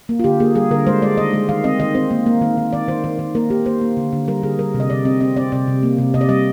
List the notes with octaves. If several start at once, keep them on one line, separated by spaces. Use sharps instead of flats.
A#3
F4
D3 G4
A#3 G#4
G3 G#4
D3 A#4
G#3 C5
G#3 D5
D#3 D#5
G#3
D#3 F5
C4 D#5
D#3 D#5
C4 C5
A#3
A#3
D#3
D#3
D#3 D5
D#3 C5
D#3
D#3
A#3 A#4
A#3 G4
A#3 C5
A#3
D3
D3
G3 A#4
D3 G#4
G3 A#4
C3
D#5
C3 D5
C4 D#5
C4 D#5
C4 D5
C3 D5
C3
A#3
C3
C3 D#5
D5
G3 D#5